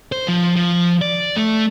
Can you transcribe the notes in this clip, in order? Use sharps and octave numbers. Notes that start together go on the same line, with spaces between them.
C5
F3
F3
D5
A3